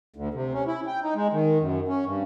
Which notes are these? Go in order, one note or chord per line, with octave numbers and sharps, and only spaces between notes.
D2
C3
C#4
E4
G5
D#4
G#3
D#3
F#2
C#4
G2